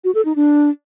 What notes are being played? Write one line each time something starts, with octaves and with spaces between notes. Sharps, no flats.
F#4
A4
D#4
D4